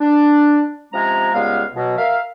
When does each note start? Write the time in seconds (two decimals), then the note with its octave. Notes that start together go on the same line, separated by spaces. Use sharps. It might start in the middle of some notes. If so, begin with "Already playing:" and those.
0.01 D4
0.93 C3 F3 G#3 C#4 A#5
1.34 C#2 G3 G#3 B3 F5
1.75 B2 F#3
1.98 A#4 E5 F5